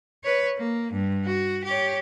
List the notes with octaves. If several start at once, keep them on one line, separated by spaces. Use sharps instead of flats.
B4 C#5
A#3
G2
F#4
G4 C#5